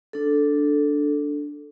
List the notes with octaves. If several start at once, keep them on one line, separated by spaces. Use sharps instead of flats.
D4 A4